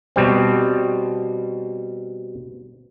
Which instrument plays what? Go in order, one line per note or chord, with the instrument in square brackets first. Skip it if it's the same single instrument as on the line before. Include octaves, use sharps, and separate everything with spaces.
[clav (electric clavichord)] B2 G3 C4